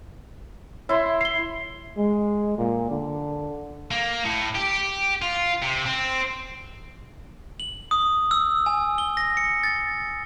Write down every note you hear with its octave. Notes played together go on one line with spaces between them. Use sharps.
E4 C#5 E5 C6
C7 G7
G#3
A#2
D3
A#3
A2
G4
F4
C3
C4
F#7
D#6
E6
G#5
G7
A#6
C#7
A6